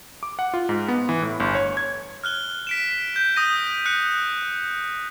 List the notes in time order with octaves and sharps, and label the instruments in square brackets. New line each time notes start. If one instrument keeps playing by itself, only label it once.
[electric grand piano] D6
F#5
F4
G#2
B3
E3
A2
G1
C#5
G#6
[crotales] F6 F#6 G7
B6 D7 E7
G6
D#6 G6 A#6 D#7
F#6 C#7